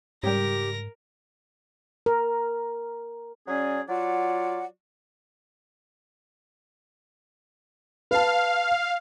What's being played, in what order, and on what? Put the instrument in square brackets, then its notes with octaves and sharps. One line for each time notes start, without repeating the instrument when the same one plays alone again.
[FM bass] G#2 [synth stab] C#3 G3 [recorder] G4 [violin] A#4 A#6
[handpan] A#4
[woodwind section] F#3 C#4 G#4 D5
F#3 F4 D5 F#5
[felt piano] B4 A5 [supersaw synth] F5